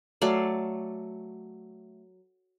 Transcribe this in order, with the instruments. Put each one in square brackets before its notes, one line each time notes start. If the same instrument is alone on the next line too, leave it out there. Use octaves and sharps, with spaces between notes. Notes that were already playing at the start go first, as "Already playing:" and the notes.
[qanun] F#3 A3 D5 F5